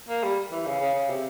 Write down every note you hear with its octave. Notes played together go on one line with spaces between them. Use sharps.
A#3
G3
E3
C#3
C#3
C#3
C3